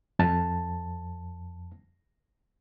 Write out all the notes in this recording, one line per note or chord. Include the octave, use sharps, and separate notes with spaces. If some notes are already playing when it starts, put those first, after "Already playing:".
F2 A5